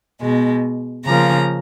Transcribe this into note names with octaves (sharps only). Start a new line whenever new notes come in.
B2 G#3
C#3 F3 A#3 A#5